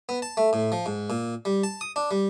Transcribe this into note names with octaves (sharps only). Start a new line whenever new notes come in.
B3
A5
A3
A2
F3
G#2
A#2
G3
A5
D#6
D4
G3